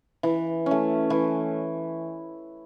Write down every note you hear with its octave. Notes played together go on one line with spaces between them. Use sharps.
E3
A3 C#4
E3